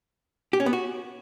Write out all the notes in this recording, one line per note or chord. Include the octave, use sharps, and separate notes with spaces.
G4
C#4
B3
F#4